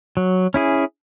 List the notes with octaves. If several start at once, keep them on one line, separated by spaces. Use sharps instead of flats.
F#3
C#4 E4 G#4